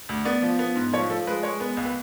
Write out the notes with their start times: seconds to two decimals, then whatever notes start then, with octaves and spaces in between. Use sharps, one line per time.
0.09 D2
0.25 B3 D5
0.42 F3
0.59 B3
0.75 G#2
0.93 F3 C#5
1.10 F3 A4
1.27 G#3 B4
1.43 G#3 C#5
1.60 B3 B4
1.77 C#2
1.85 B4